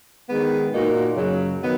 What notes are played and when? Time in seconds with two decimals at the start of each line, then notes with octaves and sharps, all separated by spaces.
0.29 D#3 G#3 B3
0.73 A#2 A#3 D#4 F#4
1.16 F#2 C#3 F#3
1.61 D#3 F#3 B3